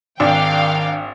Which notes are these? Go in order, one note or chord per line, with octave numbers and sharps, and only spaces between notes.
G#1 D#3 D4 F5 G5